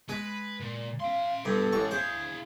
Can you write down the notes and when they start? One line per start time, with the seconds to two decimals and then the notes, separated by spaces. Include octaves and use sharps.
0.09 G#3 B4
0.60 A#2
1.00 E5 F5 C6
1.45 G2 B2 A4
1.73 A1 G#3 C#6
1.91 E4 G#4 C5 F5